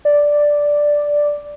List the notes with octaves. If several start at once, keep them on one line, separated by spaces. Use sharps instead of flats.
D5